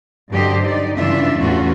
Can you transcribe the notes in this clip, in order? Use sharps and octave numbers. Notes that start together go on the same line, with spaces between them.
G2 D3 F#3 G4 C5 D#5
D#4 D5
G2 C#3 E3 D4 F4 E5
E2 A2 C#4 F4 F#4